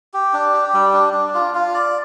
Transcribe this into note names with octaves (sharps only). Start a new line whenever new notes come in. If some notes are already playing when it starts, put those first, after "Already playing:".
G4
D4
G4
G3
D4
D4
F4
F4
D5